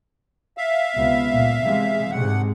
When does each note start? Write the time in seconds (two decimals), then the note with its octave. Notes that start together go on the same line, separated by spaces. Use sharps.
0.57 E5 F5
0.95 C#2 C3 B3
1.31 C#2 A#2
1.63 C3 E3 G#3
2.11 D2 G#2 C3 G#3 F#5